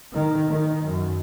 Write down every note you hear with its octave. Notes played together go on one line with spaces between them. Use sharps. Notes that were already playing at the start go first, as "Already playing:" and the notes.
D#3
D#3
F#2